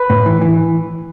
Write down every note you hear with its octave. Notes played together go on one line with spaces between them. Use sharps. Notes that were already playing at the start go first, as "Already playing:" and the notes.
Already playing: B4
A2
E3
E3